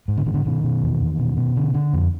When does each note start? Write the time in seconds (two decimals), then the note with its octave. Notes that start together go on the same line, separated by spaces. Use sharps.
0.08 G#2
0.17 D3
0.26 G#2 D#3
0.34 D3
0.46 B2 D#3
0.64 B2
0.83 E2
1.00 E2
1.19 B2
1.37 B2
1.57 D3
1.74 D3
1.93 F2